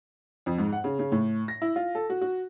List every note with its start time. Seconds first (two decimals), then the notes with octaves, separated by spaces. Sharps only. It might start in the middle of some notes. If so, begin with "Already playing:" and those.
0.46 F2
0.58 G#2
0.72 F#5
0.84 C#3
0.99 C#3
1.12 A2
1.48 A#6
1.62 E4
1.76 F4
1.95 A4
2.10 F#4
2.21 F#4